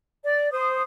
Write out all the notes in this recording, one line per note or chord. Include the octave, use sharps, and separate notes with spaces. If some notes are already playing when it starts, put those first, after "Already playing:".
D5
C5 D#6